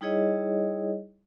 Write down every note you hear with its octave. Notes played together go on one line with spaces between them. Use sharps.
G3 D#4 E4 G#4 C#5 D#5